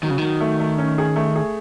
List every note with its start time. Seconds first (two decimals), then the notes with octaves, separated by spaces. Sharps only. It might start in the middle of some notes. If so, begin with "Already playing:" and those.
0.03 D#3 F#3
0.11 C#3
0.18 D#3 F#3
0.40 A3
0.60 A3
0.78 C#4
0.98 G#4
1.16 A3
1.36 G#4